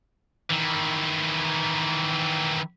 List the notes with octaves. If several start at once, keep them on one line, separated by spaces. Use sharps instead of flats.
D#3 E3